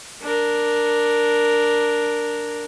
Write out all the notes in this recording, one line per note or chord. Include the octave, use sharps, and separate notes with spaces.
D4 A#4